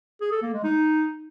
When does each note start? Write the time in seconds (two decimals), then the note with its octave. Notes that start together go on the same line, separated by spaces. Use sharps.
0.21 G#4
0.32 A4
0.43 A#3
0.53 G#3
0.64 D#4